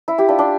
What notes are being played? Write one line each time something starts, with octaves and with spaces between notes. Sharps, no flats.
E4
E4 G4
D4 F4
D4